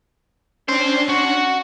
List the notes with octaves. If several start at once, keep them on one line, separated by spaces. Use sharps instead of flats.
C#4 D4 C5 G5
F#4